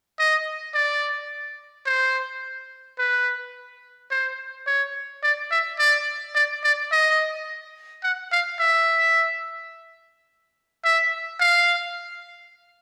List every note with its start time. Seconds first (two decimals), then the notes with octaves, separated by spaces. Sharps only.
0.19 D#5
0.74 D5
1.86 C5
2.98 B4
4.11 C5
4.67 C#5
5.23 D5
5.51 E5
5.79 D5
6.35 D5
6.64 D5
6.92 D#5
8.03 F#5
8.32 F5
8.59 E5
10.84 E5
11.40 F5